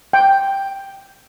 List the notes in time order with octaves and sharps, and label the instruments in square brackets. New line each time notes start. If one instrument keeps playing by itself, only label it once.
[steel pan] G5